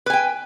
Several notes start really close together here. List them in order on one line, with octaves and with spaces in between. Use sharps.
B4 G#5 G5